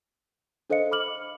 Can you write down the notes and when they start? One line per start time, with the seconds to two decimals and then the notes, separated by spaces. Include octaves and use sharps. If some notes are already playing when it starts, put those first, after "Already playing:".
0.70 D4 A4 C5 D#5 F5 C#7
0.91 B5 D6 F6 F#7